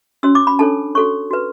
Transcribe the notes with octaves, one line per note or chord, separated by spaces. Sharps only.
C#4 F#4 C#5 E6
D6
B5
D4 A4 C#5 A5
F#4 A4 C#5 C#6
F#4 B4